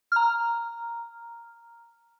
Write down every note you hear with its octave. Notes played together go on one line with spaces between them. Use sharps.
A#5 F6